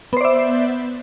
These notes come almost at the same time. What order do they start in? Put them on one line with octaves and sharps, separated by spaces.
B3 C5 D5 E5